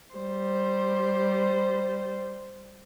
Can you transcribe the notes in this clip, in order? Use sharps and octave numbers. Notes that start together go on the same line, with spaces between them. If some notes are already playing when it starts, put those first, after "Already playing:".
G3 C5